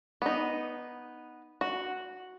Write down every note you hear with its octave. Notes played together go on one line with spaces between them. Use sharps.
B3 D#4
F#4